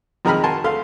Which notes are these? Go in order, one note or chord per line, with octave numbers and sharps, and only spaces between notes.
F2 D#3 G#3 A#5 B5 F6
F#4 A#4 G#5 A5 C6
D2 A3 F5 C6